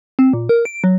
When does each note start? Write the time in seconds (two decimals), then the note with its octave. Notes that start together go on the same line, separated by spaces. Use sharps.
0.19 C4
0.33 A#2
0.49 A#4
0.65 D7
0.84 F#3